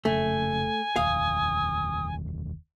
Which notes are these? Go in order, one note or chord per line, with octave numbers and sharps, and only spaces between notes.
F1 C#3 A3 C#4 G#5
F1 D#2 F5 D#6